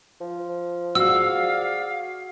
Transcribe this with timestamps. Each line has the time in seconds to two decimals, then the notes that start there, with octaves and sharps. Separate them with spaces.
0.21 F3
0.95 F#4 G#4 D5 F5 E6